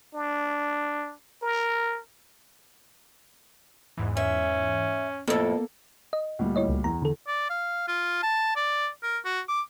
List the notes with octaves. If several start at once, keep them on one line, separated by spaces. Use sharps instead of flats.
D4
A#4
E2 G#2 E3
C#4 E5
F2 A2 A#3 B3 A4
D#5
D2 A#2 G3
E4 C#5 D#5
C#2
E2 A#5
D3 A4
D5
F5
F4
A5
D5
A#4
F#4
D6